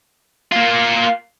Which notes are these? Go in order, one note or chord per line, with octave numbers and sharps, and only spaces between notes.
A#3 F4